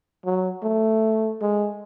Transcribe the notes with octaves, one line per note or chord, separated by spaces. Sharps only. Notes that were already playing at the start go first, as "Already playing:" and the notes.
F#3
A3
G#3